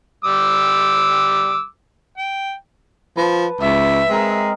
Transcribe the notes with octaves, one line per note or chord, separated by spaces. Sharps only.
G3 D6 E6
G5
F3 B4 A5
C#2 E5
G#3 C4 D#4 A#4